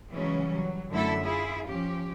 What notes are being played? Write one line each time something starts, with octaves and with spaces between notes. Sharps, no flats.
C#3 E3 F#3 G#3 C#4
F#3 G3
F#2 D3 A3 E4 A4 E5
E4 F4 G#4
F3 C#4 G4